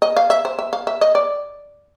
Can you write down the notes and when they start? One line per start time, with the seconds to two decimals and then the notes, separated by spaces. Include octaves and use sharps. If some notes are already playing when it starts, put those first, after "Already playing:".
0.02 D#5
0.16 F5
0.30 E5
0.45 C5
0.59 E5
0.73 F5
0.87 E5
1.01 D#5
1.15 D5